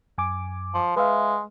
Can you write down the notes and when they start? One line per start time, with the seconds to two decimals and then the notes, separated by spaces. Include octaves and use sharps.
0.18 F#2 G#5 D6
0.74 F3
0.96 G#3 B4 E5 F5